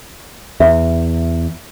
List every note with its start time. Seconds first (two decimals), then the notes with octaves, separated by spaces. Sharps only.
0.60 E2 E5